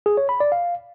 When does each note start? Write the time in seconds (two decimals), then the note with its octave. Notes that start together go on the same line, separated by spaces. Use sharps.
0.06 G#4
0.17 C#5
0.29 B5
0.40 D5
0.52 F5